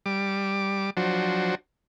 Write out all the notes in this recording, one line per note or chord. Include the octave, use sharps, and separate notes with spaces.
G3 D6
F3 F#3 D4 F#4 C5